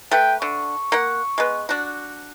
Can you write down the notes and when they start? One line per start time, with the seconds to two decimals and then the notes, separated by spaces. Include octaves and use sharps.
0.11 A3 B4 G5
0.42 D3 C#6
0.92 A#3 F#5
1.38 G#3 B3
1.69 D4 F#4